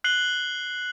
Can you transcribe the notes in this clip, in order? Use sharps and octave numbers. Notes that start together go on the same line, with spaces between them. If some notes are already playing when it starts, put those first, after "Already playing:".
F#6 C7 F#7 G7